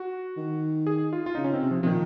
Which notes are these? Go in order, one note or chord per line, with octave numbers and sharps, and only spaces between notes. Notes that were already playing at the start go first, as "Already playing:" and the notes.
Already playing: F#4
D#3
G#4
F4
F4
C#3 D#4
C#4
C4
C3
F3
C3 F3
A#2 D#3